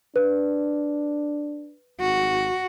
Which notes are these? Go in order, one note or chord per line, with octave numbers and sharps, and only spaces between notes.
D4 B4
G#1 F#4